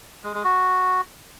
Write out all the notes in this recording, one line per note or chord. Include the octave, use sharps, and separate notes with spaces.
G#3
G#3
F#4